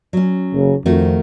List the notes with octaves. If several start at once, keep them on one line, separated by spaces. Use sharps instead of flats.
F#3 C#4
F#1 C#3
F2 D#3 A3 F#4